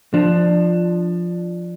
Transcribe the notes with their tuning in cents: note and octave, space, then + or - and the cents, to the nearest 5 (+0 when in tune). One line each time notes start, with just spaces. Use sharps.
F3 +0 D4 +15